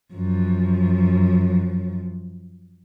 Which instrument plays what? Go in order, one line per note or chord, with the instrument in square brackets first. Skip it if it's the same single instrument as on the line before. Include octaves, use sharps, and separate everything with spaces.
[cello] F#2 F3